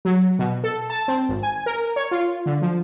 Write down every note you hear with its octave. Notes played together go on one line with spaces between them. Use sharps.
F#3
B2
A4
A5
C4
G#1
G#5
A#4
C#5
F4
D3
F3